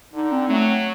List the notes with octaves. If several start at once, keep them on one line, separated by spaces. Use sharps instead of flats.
D3 D#4
C4
F#3 A3